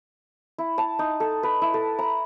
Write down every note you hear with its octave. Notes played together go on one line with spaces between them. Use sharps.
E4
A5
D#4
A4
B4
E4
A4
A#5